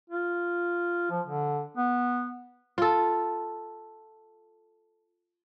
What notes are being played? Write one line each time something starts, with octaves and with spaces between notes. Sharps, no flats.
F4
F3
D3
B3
F4 A4